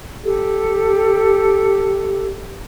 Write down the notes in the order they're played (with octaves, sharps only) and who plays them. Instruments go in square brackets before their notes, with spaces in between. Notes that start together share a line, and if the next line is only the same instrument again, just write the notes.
[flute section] G4 A4